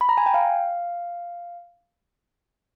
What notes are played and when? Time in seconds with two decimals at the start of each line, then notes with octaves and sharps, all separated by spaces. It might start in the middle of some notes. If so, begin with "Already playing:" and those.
0.01 B5
0.09 A#5
0.18 G#5
0.26 G5
0.34 F5